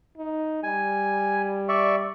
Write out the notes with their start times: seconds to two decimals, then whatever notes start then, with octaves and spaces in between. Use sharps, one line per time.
0.17 D#4
0.63 G3 G#5
1.69 D5 E5 C#6